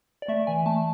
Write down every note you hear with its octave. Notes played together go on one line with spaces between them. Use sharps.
D5
A3 E5
E3 G#5
A3 A5